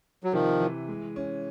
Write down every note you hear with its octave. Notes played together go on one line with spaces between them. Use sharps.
F#3
C3 D#3 F3
E3
G#3
C#4